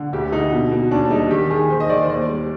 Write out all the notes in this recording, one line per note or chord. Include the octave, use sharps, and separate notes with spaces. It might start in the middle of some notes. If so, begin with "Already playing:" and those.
Already playing: D3
D2 G4
D3 D#4
B2
B2
D#2 D4
G3 D#4
D#3 G4
D#3 G#4
D#3 C5
D#5
D#3 D5
C5
D#2 D5
G3